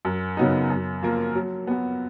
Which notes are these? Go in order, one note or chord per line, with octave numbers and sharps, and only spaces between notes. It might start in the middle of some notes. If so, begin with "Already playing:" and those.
F#2
C#3 F#3 B3 D#4
F#2
F3 A#3 F4 A#4
F#3
B3 F#4